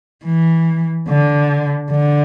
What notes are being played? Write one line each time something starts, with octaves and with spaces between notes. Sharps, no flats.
E3
D3
D3